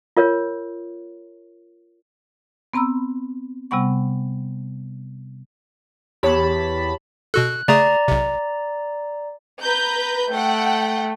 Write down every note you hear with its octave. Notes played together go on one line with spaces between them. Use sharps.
F4 A#4 C#5
B3 C4 A#5 B5 E6
C3 G3 B3 F#5 C#6
E2 G4 C#5 A5 B5
B2 F#4 A4 F#6
C#3 A3 G#4 D5 A#5
B1 C3
B4 A#5 G6
A3 F#5 G5